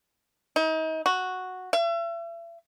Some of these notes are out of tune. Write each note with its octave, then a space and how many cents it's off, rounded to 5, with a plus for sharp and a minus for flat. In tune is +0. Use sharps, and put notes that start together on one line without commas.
D#4 +35
F#4 -5
E5 +40